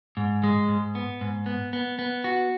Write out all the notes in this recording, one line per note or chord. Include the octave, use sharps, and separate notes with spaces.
G#2
G#3
G#2
B3
G#2
B3
B3
B3
F#4